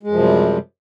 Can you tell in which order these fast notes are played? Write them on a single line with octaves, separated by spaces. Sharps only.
G#3 F#2 F3 C3 G3